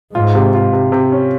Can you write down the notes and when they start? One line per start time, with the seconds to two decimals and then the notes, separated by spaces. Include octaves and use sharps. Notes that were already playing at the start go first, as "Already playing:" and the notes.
0.15 G#2 F4
0.35 C3
0.54 F4
0.73 C3
0.92 C3
1.12 C#4